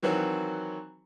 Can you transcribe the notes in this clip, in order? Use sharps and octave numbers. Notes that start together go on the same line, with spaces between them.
D#3 E3 F#3 C4 F#4